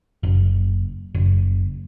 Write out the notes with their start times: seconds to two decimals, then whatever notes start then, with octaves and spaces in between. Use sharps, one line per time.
0.23 F#1
1.15 F#1